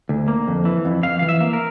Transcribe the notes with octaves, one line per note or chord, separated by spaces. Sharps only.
D2
A#3
F2
E3
F2
F2 F5
E3 F5
E5
A#3
A#4